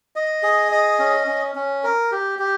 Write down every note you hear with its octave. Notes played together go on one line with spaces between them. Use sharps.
D#5
G#4
D#5
C#4
C#4
C#4
A#4
G4
G4